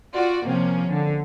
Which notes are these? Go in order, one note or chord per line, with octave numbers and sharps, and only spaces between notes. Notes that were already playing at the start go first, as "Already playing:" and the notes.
F4 F#4 D5
C3 F3 A#3 C4 C#4
D3